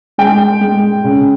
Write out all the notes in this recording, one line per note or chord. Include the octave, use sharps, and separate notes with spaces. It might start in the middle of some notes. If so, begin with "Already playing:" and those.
G#3 G5
G#3
C#3